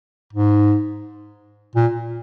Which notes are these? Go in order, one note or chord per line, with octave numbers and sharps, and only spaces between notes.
G#2
A#2